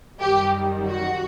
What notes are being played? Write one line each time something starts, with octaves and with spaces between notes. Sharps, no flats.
F#2 D#3 G3 G4
F#4